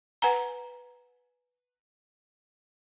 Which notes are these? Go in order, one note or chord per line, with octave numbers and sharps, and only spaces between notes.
B4 F#5 G#5 A#5